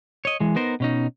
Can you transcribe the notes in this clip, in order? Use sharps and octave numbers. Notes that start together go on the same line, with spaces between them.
C#5 D#5
E3 G#3
B3 D#4 A#4 C5
B2 C#4 D#4